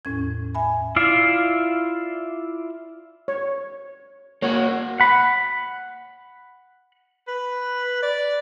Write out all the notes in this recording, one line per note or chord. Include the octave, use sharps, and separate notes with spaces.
E2 A2 C#4 G#6
E5 G#5 B5
E4 F4 D5 E5 F5
C#5
A#3 F#4 C#5
F#5 B5
B4
D5